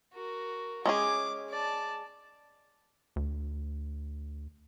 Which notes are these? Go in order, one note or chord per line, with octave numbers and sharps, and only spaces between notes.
F#4 A#4
G#3 C#4 G#4 D6
D5 A5
D2